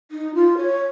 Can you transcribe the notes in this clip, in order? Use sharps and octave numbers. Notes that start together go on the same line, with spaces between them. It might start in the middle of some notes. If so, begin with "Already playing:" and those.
D#4
F4
C#5